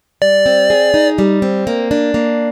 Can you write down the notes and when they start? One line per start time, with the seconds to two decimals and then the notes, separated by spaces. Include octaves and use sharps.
0.22 G3 D5
0.46 C4
0.70 G#4
0.94 D#4
1.19 G3
1.42 C4
1.67 A#3
1.91 D4
2.14 A#3